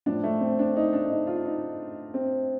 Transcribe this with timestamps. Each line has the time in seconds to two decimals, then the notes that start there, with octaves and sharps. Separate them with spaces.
0.06 A2 F3 D4
0.24 A3
0.40 C4
0.59 D4
0.76 D#4
0.93 D4
1.10 D#4
1.27 F4
1.45 D#4
2.14 C4